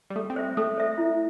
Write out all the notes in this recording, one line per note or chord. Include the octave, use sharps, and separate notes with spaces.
G3
A3 A4
C4
C5 E5
A3 A4
C5 E5
E4